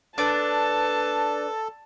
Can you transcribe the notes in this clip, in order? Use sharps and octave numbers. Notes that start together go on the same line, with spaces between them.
D4 A4 B4 A5